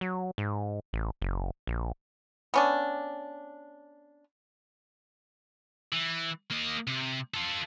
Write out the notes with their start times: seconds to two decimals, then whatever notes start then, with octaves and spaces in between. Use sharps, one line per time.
0.01 F#3
0.38 G#2
0.93 A1
1.22 F#1
1.67 A#1
2.54 B3 C#4 D4
5.93 E3
6.51 A#3 D#5
6.87 C3
7.34 F4 A4